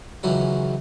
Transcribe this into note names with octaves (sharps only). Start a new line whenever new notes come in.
C#2 D#3 E3 F#3 C#4